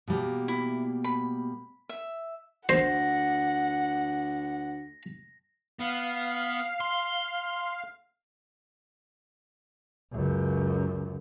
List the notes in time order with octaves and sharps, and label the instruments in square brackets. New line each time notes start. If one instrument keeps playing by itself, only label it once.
[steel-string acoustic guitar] B2 G3 A#3
[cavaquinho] E4
B5
E5
[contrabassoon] D2 [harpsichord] C5 [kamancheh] F#5 [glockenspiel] A#6
[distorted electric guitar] B3 [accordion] F5
[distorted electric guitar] C6
[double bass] C#2 F#2